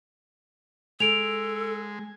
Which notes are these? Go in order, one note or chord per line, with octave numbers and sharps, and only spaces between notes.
G#3 A4 D7 F7